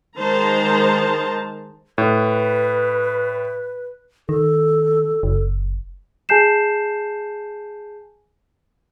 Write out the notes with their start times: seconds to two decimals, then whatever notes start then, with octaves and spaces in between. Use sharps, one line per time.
0.18 D#3 G#3 C5 A5 A#5
1.98 A2 B4
4.29 D#3 A4
5.23 F#1
6.29 G#4 G#5 A5 G6 C7 E7